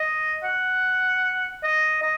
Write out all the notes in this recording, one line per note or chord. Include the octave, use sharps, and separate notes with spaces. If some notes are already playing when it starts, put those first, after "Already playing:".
Already playing: D#5
F#5
D#5
D#5